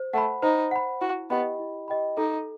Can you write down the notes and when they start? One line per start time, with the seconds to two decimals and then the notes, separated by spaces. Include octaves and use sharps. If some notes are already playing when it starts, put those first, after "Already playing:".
Already playing: C5
0.13 A3 F#5
0.18 B5
0.42 D#4 C5
0.71 F#5 B5
1.01 E4 F#4
1.30 B3 G4 D#5 G5 B5
1.59 E4
1.88 G4 D#5 G5 B5
2.17 D#4 A4